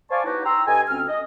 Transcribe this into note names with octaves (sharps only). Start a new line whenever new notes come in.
C5 D5 F5 G#5 A5 C#6
B3 D#4 E4 F#4 G4 C#5
G5 A#5 C6 E6
G2 A4 D#5 G#5
D2 C4 C#4 F6
D#5